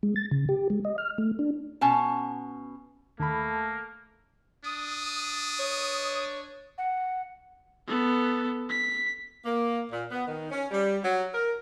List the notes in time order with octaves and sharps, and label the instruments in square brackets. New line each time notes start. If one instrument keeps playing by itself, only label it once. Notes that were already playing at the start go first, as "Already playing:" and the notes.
[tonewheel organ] G#3
A6
C#3
G4
G#3
D#5
F6
A3
D4
[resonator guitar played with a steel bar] B2 C#4 A5
[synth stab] D#2 B5 [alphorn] A3 [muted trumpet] A#3 [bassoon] A4
[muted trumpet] D4 [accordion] D#6
[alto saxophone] C#5
[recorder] F#5
[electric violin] B3 A4
B6
[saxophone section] A#3
A#2
B3
D#3
C#4
G3
F#3
A#4